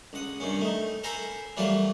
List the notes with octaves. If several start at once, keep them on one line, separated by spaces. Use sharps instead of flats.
C#2 F#5 D#6
G2 C3 D#3 C#4
A3 D#4
A4 A#4 C5 G#5 A#5 B5
E3 F#3 G3 A3 A#3 F4